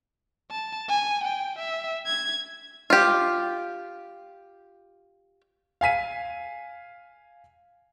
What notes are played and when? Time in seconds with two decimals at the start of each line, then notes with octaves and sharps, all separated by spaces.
0.51 A5
0.89 G#5
1.24 G5
1.59 E5
2.06 G#6
2.90 F4 G4
5.81 F5 G#5 B6 D#7